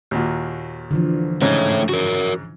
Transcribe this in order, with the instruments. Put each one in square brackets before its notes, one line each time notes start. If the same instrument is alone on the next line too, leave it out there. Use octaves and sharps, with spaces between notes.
[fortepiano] D#2 A#2 F#4
[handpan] D3 E3 F3
[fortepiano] G#2 C#3 D#4 [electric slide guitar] A3 C#5
[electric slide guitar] F#4 A#4